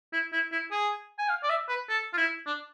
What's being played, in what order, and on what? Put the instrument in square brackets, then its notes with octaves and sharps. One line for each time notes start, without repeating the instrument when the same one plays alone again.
[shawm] E4
E4
E4
G#4
G#5
F5
D5
E5
B4
A4
F4
E4
D4